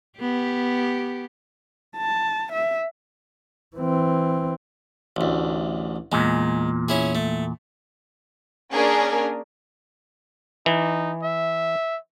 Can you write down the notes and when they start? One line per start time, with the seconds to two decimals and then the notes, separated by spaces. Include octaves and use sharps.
0.19 B3 G4
1.97 A5
2.52 E5
3.77 E3 C4
5.16 A1 D2
6.12 E2 A#2 G#3
6.88 C#4 E4 G#4
7.15 A3
8.73 A#3 C#4 D4 G#4 A#4
10.66 E3 D#4
11.23 E5